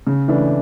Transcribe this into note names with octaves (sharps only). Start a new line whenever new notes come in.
C#3
E3 A3 D4